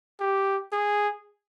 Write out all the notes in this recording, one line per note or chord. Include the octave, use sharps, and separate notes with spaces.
G4
G#4